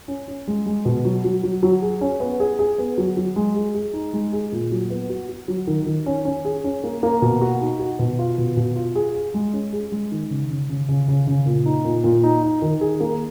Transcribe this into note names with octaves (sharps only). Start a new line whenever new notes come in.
C#4
C#4
G#3
G#3
B2
F#3
F#3
F#3
F#3
G#4
C#4
B3
G#4
G#4
B3
F#3
F#3
G#3
G#4
G#4
D#4
G#3
G#4
A#2
F#3
B3
F#4
F#4
F#3
D#3
D#3
C#4
C#4
G#4
C#4
A#3
A#3
B2
F#4
D#4
F#4
B2
F4
B2
B2
F4
G#4
G#4
G#3
C#4
G#4
G#3
D#3
C#3
C#3
C#3
C#3
C#3
C#3
A#2
D#4
A#2
A#2
D#4
D#4
D#3
G#4
A#3